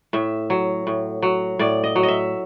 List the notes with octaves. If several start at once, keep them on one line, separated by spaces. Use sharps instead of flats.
A2 E5
F#3
A2
F#3
A2 D5
D#5
F#3
D#5
E5